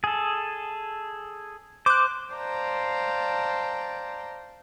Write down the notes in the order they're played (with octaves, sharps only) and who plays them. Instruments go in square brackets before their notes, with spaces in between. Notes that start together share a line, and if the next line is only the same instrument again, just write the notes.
[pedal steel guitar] G#4 A4
[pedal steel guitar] C5 [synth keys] D6 F#6
[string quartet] C5 D5 F5 G5 A5 A#5